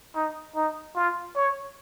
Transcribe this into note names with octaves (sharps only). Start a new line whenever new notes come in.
D#4
D#4
F4
C#5